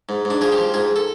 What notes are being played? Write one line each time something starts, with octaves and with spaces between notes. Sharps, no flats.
G#2
G#2
D4
F3 G#4
G4
F3
G#2 G#4
A4